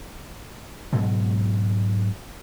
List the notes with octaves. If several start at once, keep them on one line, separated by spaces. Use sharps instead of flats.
G#2 B2 F#3 G#3